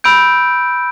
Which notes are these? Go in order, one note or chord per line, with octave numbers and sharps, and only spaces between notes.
B5 E6 G6 D7